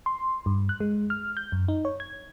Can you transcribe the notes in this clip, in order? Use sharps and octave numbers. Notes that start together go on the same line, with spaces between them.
C6
G2
F#6
G#3
F6
G6
F#2
D#4
C#5
G#6